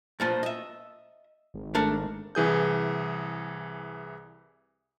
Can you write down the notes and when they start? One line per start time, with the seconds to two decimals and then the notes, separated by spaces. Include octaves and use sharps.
0.20 G2 A#2 F3
0.43 D#5 E5
1.54 G#1
1.75 A3 D4 A#4
2.35 C2 E3 G#4 G6